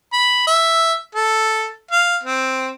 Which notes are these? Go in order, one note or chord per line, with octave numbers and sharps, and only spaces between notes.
B5
E5
A4
F5
C4